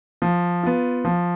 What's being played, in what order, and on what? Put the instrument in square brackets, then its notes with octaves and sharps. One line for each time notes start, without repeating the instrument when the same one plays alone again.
[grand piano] F3
B3 F4
F3